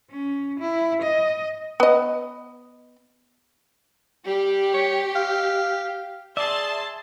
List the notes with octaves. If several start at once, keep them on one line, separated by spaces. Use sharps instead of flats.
C#4
E4
D#5
B3 D#5
G3 G4
C#5
F5
G#4 D5 E5 A5 C6